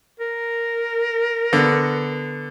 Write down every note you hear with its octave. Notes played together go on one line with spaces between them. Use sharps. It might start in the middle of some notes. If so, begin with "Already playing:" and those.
A#4
D3 B3